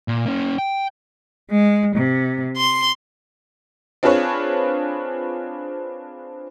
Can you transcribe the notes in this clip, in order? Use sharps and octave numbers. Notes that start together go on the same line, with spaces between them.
A#2
A#3 C#4
G5
G#3
C3
C6
C4 D4 F4 G#4 B4 C#5